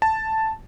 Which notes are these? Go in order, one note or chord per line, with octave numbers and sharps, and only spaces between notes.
A5